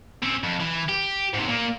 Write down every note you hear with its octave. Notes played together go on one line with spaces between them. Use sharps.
C4 C#4
F2
E3
G4
G#2 C3
A#2 A#3